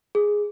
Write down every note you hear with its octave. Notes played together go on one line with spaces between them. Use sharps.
G#4